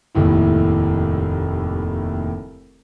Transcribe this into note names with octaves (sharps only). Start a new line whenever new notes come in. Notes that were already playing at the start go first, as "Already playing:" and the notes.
F1 D#2 A2 E4